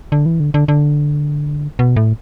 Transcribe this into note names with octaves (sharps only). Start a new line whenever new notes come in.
D3
E3
D3
D3
D3
B2
A2